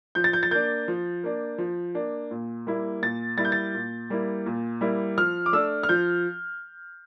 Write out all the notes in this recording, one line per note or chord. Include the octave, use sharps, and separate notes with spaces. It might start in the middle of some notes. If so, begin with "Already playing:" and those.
F3 G6
A6
G6
A6
A#3 D4 G6
F3
A#3 D4
F3
A#3 D4
A#2
G3 A#3 E4
A#2 A6
G3 A#3 E4 A6
G6
A6
A#2
G3 A#3 E4
A#2
G3 A#3 E4
F3 F6
D6
A3 D4 E6
F6
F3 G6